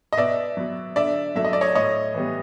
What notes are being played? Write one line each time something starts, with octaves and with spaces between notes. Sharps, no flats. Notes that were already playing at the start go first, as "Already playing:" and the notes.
D#5
B2 D5 E5
F#3 B3
D3 D5 E5
F#3 A3 E5
D#5
D5
C#5 D#5
A2 C#5 D#5
E3 G3 B3